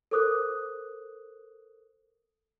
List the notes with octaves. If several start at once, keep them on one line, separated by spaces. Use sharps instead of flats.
A4 A#4 C5 D6 D#6 F#6